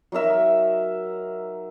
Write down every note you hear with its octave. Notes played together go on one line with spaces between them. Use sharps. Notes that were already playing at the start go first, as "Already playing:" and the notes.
F#3 D#4 A#4 E5